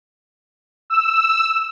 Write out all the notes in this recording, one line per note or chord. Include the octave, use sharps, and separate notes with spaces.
E6